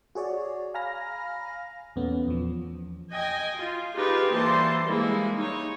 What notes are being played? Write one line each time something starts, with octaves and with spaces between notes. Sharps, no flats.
F#4 G#4 C#5 D5
F5 G#5 A#5 B5 F6 A#6
E2 A#2 A3 B3 C#4
E2 F3
D#5 G5 G#5
F4
D#4 F4 G4 G#4 B4
E3 G3 A#3 C5 A5 C6
G3 G#3 A#3 E4 G#4
D#4 C#5